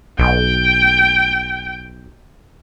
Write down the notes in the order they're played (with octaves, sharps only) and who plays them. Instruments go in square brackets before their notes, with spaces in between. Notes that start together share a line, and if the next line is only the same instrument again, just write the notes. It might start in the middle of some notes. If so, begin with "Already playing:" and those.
[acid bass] B1 [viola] G5